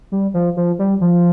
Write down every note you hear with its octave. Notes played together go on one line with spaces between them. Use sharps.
G3
F3
F3
G3
F3